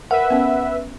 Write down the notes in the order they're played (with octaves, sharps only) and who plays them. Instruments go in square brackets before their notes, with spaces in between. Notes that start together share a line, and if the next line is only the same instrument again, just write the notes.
[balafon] A#4 [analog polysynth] B4 E5 [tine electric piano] F#5
[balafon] B3 C#4